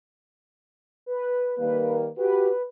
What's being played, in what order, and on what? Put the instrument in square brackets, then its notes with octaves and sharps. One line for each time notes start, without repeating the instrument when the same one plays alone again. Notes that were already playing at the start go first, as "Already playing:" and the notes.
[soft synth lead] B4
[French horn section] D#3 G3 A#3 [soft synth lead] B4
[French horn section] F#4 G4 [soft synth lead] B4